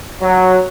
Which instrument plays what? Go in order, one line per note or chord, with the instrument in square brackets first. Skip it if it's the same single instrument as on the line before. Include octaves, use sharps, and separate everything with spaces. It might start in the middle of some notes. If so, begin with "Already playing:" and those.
[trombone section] F#3